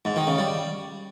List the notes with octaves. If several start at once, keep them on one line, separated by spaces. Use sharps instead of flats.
G#2
D#3
C#3
G3